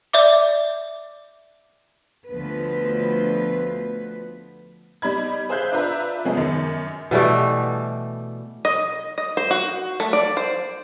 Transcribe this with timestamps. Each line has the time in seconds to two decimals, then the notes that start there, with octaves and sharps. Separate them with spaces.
0.13 D5 E5 D6
2.28 D2 F3 B3 B4
5.02 G3 D#4 B5 G#6
5.49 G#4 C5 E5 F5 F#6 G6
5.72 D4 F4 B4 E5 A#5
6.25 C3 F3 G#3 B3 C#4 G#4
6.37 F#2 D#3
7.11 B2 E3 G3 A3
8.65 D#5
9.18 D#5
9.37 C5
9.51 F#4
10.00 A3
10.13 D5
10.37 C5